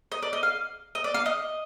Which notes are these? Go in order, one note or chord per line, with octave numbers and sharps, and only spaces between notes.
D#5
D5
D#5
F5
D#5
D5
F5
D#5